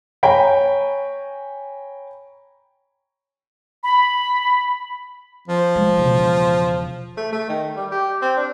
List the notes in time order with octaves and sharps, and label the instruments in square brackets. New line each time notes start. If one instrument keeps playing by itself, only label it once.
[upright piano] C#5 G5 G#5 A#5 B5
[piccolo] B5
[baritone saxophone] F3
[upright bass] G#3
E1 C#3
[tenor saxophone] A3
A3
D#3
G3
G4
C4
D4